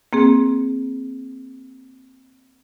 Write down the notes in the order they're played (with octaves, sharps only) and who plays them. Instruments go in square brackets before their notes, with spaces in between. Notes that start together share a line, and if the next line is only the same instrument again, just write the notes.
[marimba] A#3 C4 G#4